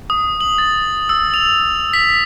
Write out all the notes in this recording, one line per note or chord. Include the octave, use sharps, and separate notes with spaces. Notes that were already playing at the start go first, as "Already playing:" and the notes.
D#6
F#7
A6
E6
F7
B6